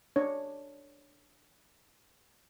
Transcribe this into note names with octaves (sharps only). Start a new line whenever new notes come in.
D4 C#5